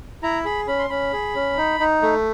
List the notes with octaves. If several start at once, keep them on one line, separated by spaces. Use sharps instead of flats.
E4 A#5
G#4 B5
C#4 B5
C6
C#4 B5
G#4
C#4
D#4
D#4
A3